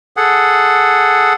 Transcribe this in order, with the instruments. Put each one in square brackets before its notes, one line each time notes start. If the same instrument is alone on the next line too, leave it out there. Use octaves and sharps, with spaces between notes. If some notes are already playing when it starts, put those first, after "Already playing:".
[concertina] G#4 A4 F#5